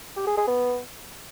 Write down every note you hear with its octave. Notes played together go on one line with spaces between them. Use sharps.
G4
G#4
G#4
B3